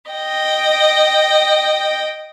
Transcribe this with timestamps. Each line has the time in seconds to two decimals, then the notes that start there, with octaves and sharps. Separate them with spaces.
0.11 D#5 G5